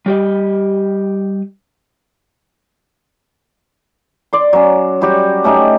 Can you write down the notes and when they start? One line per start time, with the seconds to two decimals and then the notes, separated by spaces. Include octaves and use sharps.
0.06 G3 G4 D#5
4.33 D5 C6
4.53 F#3 C#4
5.01 F#3 G3 F#4 G4
5.44 A3 C#4 D#4 G4